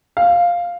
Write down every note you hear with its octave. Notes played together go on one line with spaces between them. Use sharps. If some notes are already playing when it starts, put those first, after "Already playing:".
F5